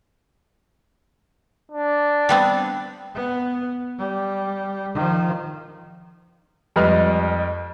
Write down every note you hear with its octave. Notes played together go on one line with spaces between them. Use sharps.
D4
G3 B3 C4
B3
G3
D#3 F3
F2 G3 G#3 B4 D#5 F6